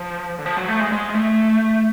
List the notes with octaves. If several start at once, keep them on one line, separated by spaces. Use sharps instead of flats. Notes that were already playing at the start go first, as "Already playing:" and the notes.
Already playing: F3
D3
F3
F#3
A3
G#3
G#3
G#3
A3